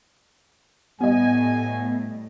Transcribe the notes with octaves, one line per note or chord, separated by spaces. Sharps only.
A2 G3 B3 D#5 G#5